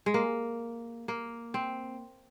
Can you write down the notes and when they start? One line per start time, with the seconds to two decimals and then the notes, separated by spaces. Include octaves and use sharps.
0.06 G#3
0.14 A#3
1.08 A#3
1.54 C4